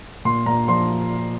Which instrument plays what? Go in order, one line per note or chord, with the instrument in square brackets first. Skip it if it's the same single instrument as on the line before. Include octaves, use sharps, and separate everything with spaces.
[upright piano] A#2 C6
A#2 A#5
F3 C6